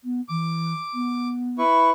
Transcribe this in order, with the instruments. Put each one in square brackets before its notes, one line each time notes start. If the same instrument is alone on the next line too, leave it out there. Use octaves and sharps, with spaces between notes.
[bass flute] B3
[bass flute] E3 [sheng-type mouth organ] D6
[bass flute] B3
[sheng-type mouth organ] E4 B4 C#6